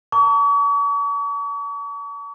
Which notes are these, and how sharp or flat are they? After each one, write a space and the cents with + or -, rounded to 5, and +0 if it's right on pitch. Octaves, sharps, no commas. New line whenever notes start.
A5 +45 C#6 +45